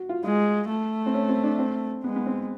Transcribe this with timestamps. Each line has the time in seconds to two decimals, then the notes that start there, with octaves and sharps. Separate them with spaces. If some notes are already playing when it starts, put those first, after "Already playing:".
Already playing: F#4
0.09 F4
0.24 G#3 F4
0.69 A3
1.06 C4
1.14 C#4
1.29 C4
1.43 D4
1.59 C4
2.04 G#3 B3
2.16 B3
2.26 C4